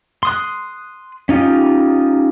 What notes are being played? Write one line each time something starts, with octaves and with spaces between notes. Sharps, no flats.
C6 D#6 F#6
C#4 D#4 F4 G4